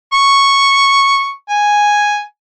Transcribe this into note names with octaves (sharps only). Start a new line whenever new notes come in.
C#6
G#5